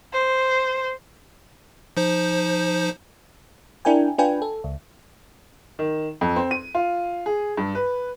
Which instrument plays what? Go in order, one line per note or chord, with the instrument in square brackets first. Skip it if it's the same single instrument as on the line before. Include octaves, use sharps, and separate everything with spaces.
[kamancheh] C5
[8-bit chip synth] F3 D#4 C5
[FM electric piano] D4 E4 A#4 G5 G#5
D4 F4 B4 G5 G#5
A4
C#2
[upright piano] D#3
F2
C4
D#7
F4
G#4
G2
B4